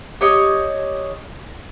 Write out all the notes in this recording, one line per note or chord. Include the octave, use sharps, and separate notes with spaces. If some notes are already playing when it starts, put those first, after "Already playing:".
G4 C#5 D#5